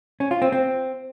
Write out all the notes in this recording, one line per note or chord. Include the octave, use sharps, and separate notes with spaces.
C#4
F4
C4
C4